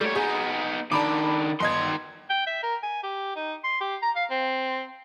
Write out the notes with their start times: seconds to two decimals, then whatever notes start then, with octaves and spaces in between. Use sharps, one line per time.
0.01 G3 A3 C#5
0.15 B3 D#4 G#4
0.92 D#3 D4 A5 B5 D6
1.60 G1 D#3 D#5 C6 G#6
2.30 G5
2.46 E5
2.63 A#4
2.83 G#5
3.03 G4
3.36 D#4
3.64 C6
3.81 G4
4.02 A#5
4.16 F5
4.30 C4